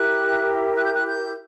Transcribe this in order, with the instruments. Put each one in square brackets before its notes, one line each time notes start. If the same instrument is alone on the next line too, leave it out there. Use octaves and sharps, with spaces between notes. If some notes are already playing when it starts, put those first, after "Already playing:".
Already playing: [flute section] E4 G4 A#4 F#6
F#6
G6
F#6
G6